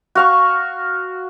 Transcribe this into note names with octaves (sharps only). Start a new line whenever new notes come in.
F#4 F5 C#6